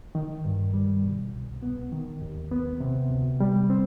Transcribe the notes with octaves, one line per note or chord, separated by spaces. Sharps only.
D#3
G2
G3
B2
C2
B3
D#3
D#2
B3
C3
D2
G3
C4